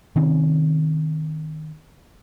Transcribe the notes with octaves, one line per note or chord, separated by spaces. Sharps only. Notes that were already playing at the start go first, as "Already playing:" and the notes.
C3 D#3 C4 C#4